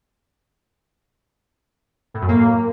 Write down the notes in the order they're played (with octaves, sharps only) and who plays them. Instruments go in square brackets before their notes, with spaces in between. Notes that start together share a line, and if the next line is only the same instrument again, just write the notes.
[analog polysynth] A2
F#2
A#3